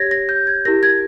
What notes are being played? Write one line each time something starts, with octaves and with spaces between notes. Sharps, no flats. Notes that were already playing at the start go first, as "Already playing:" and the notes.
Already playing: G4 C#5 G#6 A#6
A#6
G6
G#6
E4 G4 A#4 A#6
G#6